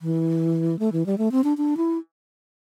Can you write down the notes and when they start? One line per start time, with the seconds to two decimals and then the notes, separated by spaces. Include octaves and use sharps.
0.02 E3
0.79 A3
0.92 E3
1.06 G3
1.18 A3
1.32 C4
1.44 D4
1.58 D4
1.77 E4